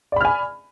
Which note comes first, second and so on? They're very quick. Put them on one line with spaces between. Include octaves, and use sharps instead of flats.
D5 B5 F6 G#5